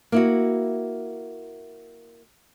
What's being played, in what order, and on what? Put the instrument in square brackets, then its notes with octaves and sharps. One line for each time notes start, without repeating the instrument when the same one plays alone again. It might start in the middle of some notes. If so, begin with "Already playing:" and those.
[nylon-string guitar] A#3 E4 F#4